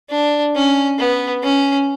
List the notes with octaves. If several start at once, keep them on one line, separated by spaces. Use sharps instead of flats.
D4
C#4
B3
C#4